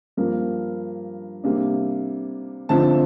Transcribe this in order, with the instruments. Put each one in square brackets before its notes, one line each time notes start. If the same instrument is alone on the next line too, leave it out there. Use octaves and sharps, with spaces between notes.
[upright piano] G2 F3 A#3 A#4
C3 G3 A#3 D4
D3 F3 A3 C4 D#4 A5